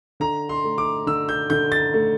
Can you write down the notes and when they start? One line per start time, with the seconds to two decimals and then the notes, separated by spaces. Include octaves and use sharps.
0.20 D3 A#5
0.49 C6
0.64 A3
0.78 D6
1.06 D3 E6
1.29 G6
1.50 D3 G6
1.72 A6
1.94 A3